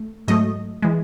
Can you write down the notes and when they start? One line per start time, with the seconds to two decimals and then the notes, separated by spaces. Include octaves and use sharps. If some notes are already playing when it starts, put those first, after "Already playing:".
Already playing: A3
0.28 G#2 F#3 A3 D#5
0.82 E3 G#3